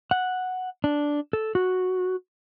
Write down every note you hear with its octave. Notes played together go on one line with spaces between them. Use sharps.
F#5
D4
A4
F#4